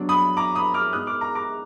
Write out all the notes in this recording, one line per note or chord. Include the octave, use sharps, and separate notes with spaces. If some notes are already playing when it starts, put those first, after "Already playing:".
Already playing: B2 F#3 D4
B5 D#6
A#5 D6
B5 D#6
D6 F6
B2 G#3 D#4 D#6 F#6
D6 F6
A#5 D6
A#5 D6